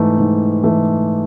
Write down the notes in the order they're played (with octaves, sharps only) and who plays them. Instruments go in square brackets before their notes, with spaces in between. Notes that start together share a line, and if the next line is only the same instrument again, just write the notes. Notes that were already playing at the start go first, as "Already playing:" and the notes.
Already playing: [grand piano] G#2 E3 A3
G#2
E3 A3